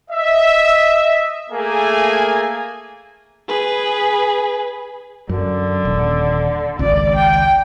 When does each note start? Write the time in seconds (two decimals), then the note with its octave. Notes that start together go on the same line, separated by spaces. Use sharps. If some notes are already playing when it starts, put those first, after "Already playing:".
0.11 D#5 E5
1.51 A3 A#3 G#4 G#5
3.48 G#4 B4
5.29 F#2 D3
5.85 D#1
6.79 G#1 C#2 D5
7.16 G5